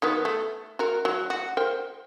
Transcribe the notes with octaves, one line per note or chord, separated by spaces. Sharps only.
D#3 F#3 B3
A3
F#4 A#4
F#3
F#4
A#4 C5 G5